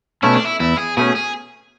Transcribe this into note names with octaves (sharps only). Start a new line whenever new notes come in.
B2 A3 C#4 E4
D4
E4
E2 E4
G#4
B2 A3 C#4 G#4
G#4